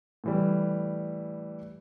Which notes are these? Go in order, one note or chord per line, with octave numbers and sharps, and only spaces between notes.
A2 E3 G3